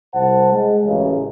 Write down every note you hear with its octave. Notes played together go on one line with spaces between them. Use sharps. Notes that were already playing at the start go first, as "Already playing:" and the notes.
C2 C5 F#5 A5
G#3
A1 F#2 C#3